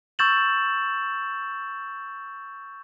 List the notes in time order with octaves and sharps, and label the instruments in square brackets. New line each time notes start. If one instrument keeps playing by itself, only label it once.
[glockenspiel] C#6 E6 G6 A6 E7 F#7